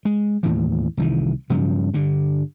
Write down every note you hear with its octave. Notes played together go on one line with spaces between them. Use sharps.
G#3
D#2 A2 E3
C2 D#3 E3
G2 C#3 F3 F#3
G2 D3